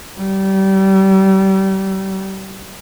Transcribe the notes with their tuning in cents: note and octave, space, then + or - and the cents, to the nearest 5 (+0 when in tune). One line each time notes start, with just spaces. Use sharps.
G3 -30